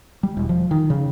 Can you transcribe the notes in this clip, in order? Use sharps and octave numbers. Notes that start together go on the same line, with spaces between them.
G3
E1
F3
D#3
C#3